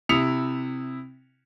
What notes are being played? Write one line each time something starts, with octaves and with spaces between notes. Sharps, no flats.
C3 E4 D#6 C#7 F7